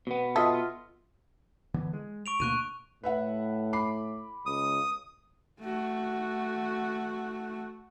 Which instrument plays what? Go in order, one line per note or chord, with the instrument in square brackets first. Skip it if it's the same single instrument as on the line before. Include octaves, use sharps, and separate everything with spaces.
[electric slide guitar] B2 B3
[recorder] F4 [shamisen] A4 [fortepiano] D#5 E5 D#6
[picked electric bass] D3 E3 B3
G#3
[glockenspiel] C#6 D7 F7
[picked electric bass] D2 B2 A#3 [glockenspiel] C#6 F#6 D#7
[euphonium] A2 [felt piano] B4 E5 F#5
[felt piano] B5 D6 C7
[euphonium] C#2 [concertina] D#6
[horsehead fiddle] A3 F#4